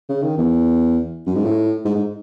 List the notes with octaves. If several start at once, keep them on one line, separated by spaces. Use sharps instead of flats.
C#3
D#3
E2
F#2
G#2
A2
G#2
G#2